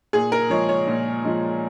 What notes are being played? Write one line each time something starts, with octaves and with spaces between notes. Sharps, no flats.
A#2 G#4
A#4
F3 G#3 C#5
C#5
A#2
F3 G#3